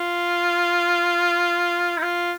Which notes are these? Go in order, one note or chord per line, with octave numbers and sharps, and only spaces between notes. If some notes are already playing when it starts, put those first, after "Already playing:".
Already playing: F4
D#4
F4